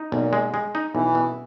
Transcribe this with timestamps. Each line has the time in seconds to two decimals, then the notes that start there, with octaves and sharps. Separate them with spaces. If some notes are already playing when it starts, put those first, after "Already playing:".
Already playing: D#4
0.12 B1 A#2
0.33 G#3
0.54 G#3
0.75 D#4
0.94 B1 E3
1.15 B2